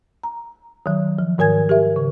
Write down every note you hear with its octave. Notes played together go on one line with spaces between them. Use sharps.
A#5
D#3 F#3
F3
G#2 D#3 A#4 G#5 G#6
G4 A#4 E5
C#3